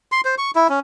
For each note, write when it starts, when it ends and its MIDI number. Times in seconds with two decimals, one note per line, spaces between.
0.12 0.21 84
0.25 0.35 72
0.38 0.51 85
0.55 0.68 64
0.69 0.80 61